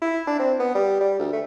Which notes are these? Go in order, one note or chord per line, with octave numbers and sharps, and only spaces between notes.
E4
D4
C4
B3
G3
G3
D2
A3